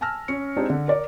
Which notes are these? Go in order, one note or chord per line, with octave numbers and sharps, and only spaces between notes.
G#5 A5 E6 F6 A#6
C#4 C#7
G#3 C4 D4 D#4 G4 G#4
D3
A#4 D5